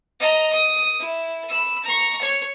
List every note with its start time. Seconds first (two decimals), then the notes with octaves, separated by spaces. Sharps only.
0.20 D#5 A#5
0.53 D#6
0.99 E4
1.49 B5 E6
1.84 A#5 C#6
2.21 C#5